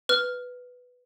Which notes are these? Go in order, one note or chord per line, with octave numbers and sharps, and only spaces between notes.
B4 F6